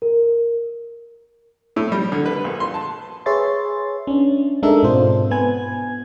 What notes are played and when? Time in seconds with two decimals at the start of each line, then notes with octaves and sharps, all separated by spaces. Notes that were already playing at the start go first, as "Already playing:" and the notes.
0.02 A#4
1.76 A2
1.92 G3
2.12 D3
2.26 B4
2.44 A#1
2.60 C6
2.74 A5
3.26 G#4 B4 C#5 E5 C6 A6
4.07 C#4 D4
4.63 G#3 D4 D#4 A4 A#4 E5
4.83 G#2 B2 C4 F4 C5
5.31 B3 B4 G#5 G#6